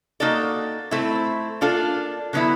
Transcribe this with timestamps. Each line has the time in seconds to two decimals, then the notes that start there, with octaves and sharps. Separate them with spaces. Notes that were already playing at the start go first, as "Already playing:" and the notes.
0.20 A#3 D#4 F#4 A4 D5
0.91 A3 C4 E4
1.61 A#3 D4 F4 A4
2.33 D3 F#3 B3 E4